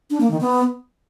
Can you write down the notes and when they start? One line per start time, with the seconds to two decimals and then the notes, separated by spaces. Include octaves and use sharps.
0.10 D4
0.21 A#3
0.31 D#3
0.41 B3